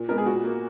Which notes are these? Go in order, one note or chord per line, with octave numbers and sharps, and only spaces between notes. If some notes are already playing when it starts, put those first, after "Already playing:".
Already playing: A#2
G#3 B3 A#4
G#4
A#2 F#4
A#3